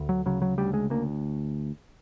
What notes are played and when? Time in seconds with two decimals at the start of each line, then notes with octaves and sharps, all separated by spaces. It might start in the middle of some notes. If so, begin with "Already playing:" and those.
Already playing: D2
0.09 F#3
0.26 C#3 F#3
0.42 F#3
0.58 D2 G3
0.74 G#3
0.90 D2 A#3